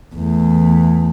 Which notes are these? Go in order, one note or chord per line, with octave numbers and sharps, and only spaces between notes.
E2 A3